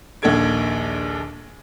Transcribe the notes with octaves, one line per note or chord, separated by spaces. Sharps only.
A#1 D#2 D4 A4 G#6 D7